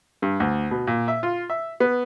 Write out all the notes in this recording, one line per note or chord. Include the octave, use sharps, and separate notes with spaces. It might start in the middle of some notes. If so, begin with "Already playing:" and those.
G2
D2
B2
A#2
E5
F4
E5
B3